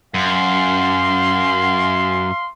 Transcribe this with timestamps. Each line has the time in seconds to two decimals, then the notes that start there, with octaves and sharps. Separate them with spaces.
0.14 F#2 F5 C6